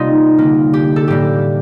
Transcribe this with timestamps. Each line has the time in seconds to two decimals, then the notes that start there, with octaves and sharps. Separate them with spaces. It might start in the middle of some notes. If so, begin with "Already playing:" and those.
Already playing: C3 G3 A#3 D#4 F4
0.38 D3 G3 A#3
0.74 G4
0.96 A4
1.08 A2 G3 A#3 G4